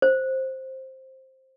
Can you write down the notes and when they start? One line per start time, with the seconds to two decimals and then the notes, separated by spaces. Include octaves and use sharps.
0.02 C5